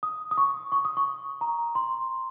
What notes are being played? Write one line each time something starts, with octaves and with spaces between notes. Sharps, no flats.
D#6
D#6
C#6
C#6
D#6
C#6
A#5
C6